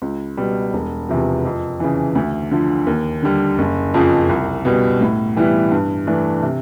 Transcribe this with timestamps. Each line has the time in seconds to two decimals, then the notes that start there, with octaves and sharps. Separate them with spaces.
0.02 C#2
0.37 B2 G3
0.74 E1
1.09 E2 C3 F3
1.45 F2
1.80 C#3 E3
2.15 D2
2.51 D3 F3
2.87 D#2
3.22 D3 G3
3.58 F#1
3.94 F2 C#3 F3
4.29 C2
4.65 B2 G3
5.01 A2
5.36 E3 G3 B3 E4
5.72 G2
6.07 E3 A3 D4
6.43 C3